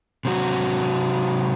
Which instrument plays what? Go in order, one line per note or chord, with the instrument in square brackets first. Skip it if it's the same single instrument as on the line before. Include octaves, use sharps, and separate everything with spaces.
[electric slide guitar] C3 F#3 C4 F#4